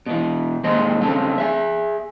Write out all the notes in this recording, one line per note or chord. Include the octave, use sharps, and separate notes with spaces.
B2 E3
D#2 A#2 G#3 C5 D#5
F2 C#3 A3 C4 D4
G#4 E5